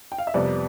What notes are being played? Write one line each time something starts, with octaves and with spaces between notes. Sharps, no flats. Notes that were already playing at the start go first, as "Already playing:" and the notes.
G5
F5
E5
F2 C3 G3 B3 D5